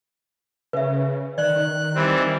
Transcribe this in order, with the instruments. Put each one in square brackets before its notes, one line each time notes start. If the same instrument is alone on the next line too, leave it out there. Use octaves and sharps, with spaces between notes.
[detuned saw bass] C#3 [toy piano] B4 E5
[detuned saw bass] D#3 [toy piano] D5 [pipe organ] F#6
[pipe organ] E3 G3 C4